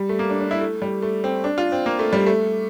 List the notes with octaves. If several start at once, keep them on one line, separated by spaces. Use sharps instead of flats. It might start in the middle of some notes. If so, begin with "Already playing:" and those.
Already playing: G3
A3
A#3
D4
D4
E4
A3
G3
A3
C4
D4
F4
C4
A#3
A3
G3
A3